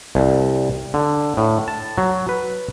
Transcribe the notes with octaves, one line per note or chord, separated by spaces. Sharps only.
C2
D3
A2
A5
F#3
B4